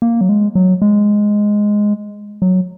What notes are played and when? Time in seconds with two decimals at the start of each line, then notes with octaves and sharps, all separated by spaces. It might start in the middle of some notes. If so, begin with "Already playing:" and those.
0.02 A#3
0.21 F#3
0.29 G#3
0.55 F#3
0.82 G#3
2.42 F#3